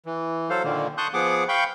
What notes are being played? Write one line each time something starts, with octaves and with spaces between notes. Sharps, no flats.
E3
F#3 A4 C5 F5
A#2 D3 D#3 A#3
A5 C6 C#6 D#6 F#6 G6
F3 B3 G#4 F#5 D6
F5 G5 B5 C#6 G6